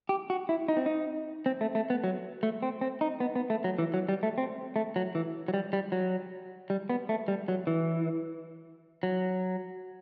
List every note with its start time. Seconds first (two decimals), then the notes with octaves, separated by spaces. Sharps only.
0.09 G4
0.30 F#4
0.49 E4
0.68 D#4
0.77 C4
0.86 D#4
1.46 C4
1.61 A3
1.75 A3
1.90 B3
2.04 F#3
2.43 A3
2.63 C4
2.81 C4
3.01 D#4
3.20 B3
3.36 B3
3.50 A3
3.64 F#3
3.79 E3
3.94 F#3
4.09 G3
4.23 A3
4.38 C4
4.76 A3
4.96 F#3
5.15 E3
5.48 F#3
5.54 G3
5.73 G3
5.92 F#3
6.70 G3
6.90 B3
7.09 A3
7.28 G3
7.48 F#3
7.67 E3
9.03 F#3